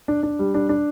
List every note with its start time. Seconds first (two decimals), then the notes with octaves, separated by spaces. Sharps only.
0.08 D4
0.23 D4
0.39 G3
0.54 D4
0.69 D4